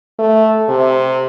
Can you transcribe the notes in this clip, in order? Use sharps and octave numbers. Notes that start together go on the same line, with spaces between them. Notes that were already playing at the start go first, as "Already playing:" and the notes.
A3
C3